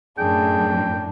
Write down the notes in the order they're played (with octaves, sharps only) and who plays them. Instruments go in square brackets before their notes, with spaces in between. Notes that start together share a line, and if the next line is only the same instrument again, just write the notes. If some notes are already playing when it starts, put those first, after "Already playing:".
[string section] F#2 A2 [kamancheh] D4 [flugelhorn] G#4 [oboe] G5